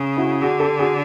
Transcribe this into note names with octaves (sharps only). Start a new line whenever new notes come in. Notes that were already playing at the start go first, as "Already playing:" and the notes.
Already playing: C#3
E4 F#4
D3 F#4 G#4
G4 A4
F#4 G#4